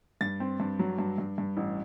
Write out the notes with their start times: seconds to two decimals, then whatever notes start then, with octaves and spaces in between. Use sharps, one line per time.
0.21 G2 A6
0.40 C4
0.60 G2
0.79 F#3
0.99 G2
1.18 G2
1.38 G2
1.57 A1